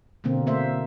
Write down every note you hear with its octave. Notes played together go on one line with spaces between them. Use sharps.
B2 D3 A#3 C4
A3 A#3 C5 E5